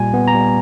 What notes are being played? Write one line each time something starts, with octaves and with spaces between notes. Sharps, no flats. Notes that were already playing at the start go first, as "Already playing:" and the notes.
Already playing: A#2 G3 G#5
B3
A#5
G3